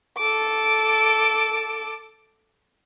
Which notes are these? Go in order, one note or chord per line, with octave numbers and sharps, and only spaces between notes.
A4 D6